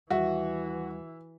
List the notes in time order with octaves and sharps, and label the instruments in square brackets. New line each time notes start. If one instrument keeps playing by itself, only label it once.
[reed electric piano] D#2 G3 [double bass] E3 [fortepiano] F#4 [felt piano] E5